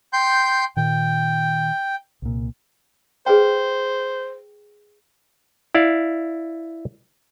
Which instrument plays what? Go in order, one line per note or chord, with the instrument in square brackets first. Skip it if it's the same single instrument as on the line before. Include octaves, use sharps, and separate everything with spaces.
[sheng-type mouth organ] G5 C6 G6
[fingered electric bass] A#2 D#3 [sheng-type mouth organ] G5
[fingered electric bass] C2 A#2
[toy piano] G#4 B4 G5 [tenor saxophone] C5
[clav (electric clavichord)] E4 D5 F5